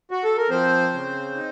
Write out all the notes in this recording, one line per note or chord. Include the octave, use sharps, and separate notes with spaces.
F#4
A4
A#4
F3 C4 C5
C#3
D#4